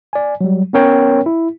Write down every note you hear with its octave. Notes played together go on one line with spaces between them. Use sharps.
D5 G#5
F#3 G3
B3 C#4 A#4 C#5 G5
E4